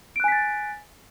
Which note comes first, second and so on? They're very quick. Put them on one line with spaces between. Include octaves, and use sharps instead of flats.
D7 F#6 G#5 B6 A6